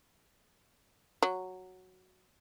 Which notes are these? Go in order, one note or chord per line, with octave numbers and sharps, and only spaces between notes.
F#3